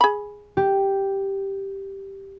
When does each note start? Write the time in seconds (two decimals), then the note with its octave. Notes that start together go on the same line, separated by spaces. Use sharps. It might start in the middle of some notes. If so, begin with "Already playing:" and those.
0.01 G#4 B5
0.57 G4